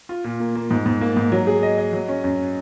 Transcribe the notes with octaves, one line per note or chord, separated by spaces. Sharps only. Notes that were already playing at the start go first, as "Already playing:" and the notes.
F4
A#2
A#3
A#3
G#2
G#2
A#3
G#2
F#3
G#4
D#5
D#5
F#3
C#4
F#2